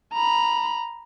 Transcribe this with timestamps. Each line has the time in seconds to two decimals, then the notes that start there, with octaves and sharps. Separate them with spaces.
0.13 A#5 B5